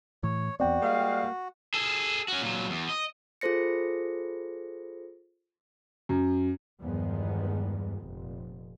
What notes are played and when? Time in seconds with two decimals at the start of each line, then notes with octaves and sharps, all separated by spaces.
0.23 A2 E3 C#5
0.60 E2 B3 C4 F#4 D5 G5
0.82 G3 G#3 A#3 F5
1.74 G#4 A4
2.28 C#4 F#4
2.41 A#2 F#3
2.70 E2
2.89 D#5
3.41 F4 G#4 A4 C5 A#6 C#7
6.09 F#2
6.80 E2 G2 D#3 F3 G#3 B3
7.99 F1 A#2